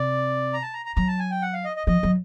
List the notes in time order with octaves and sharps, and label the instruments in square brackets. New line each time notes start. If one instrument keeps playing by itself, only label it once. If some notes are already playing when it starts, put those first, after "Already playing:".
Already playing: [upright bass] C3 [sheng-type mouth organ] D5
[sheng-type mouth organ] A#5
A5
A#5
A#5
[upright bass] F#3 [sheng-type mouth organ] A#5
[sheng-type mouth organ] A5
G#5
G5
F#5
F5
D#5
D#5
[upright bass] F3 [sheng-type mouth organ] D#5
[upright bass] F#3